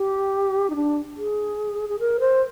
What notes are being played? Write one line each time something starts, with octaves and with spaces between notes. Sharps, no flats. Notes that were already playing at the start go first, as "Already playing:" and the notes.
Already playing: G4
D#4
D4
G#4
G#4
A#4
C5